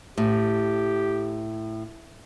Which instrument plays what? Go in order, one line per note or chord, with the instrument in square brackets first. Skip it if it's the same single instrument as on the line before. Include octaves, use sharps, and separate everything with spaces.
[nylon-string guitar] A2 [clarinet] G4